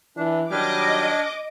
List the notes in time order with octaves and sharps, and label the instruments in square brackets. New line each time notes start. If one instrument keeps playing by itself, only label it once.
[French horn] E3 [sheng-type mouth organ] D4
[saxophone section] D#3 G3 [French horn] F#3 [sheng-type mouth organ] D4 G#5 F6 [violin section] D#5 D6